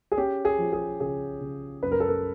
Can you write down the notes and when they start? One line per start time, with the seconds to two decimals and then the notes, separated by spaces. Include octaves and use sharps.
0.12 G#4
0.17 C#4 G4
0.45 G#4
0.59 F3
0.73 G#4
1.00 C#3 G#4
1.41 C#3
1.83 F#2 B4
1.92 A#4
2.00 A4
2.08 A#4